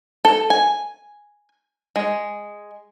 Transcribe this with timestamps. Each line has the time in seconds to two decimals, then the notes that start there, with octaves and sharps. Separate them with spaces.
0.25 A4
0.50 G#5
1.96 G#3